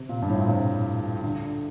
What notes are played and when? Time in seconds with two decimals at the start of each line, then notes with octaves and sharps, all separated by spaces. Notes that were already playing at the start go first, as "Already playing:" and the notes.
Already playing: C3
0.09 A#2
0.22 G2
0.30 A2
0.39 A#2
0.47 C3
1.23 D3